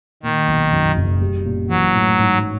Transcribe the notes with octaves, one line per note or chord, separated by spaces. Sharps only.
A#2 D#3
B1
F#2
F#1
G3
A#2
E3 F#3
A2
G#2